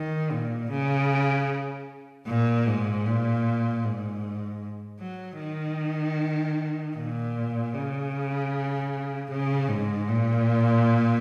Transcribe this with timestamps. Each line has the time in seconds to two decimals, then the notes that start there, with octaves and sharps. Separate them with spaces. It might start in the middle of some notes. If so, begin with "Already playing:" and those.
Already playing: D#3
0.33 A#2
0.72 C#3
2.28 A#2
2.66 G#2
3.06 A#2
3.84 G#2
5.00 F#3
5.40 D#3
6.96 A#2
7.73 C#3
9.30 C#3
9.68 G#2
10.08 A#2